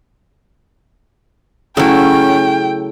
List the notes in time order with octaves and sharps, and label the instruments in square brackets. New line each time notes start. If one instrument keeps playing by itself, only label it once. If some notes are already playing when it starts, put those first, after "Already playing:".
[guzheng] C#3 F#3 [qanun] A3 E4 [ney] C#4 [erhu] G5